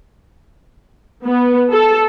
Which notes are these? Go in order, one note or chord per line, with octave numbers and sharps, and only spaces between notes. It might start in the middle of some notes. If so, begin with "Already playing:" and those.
B3
A4